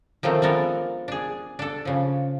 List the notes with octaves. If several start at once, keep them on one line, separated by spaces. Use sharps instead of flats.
D#3 F3 F#3 A3 C4
F3 G#3 B3 D4 A4 A#4
D4 G#4
D4 A4
C#3 F3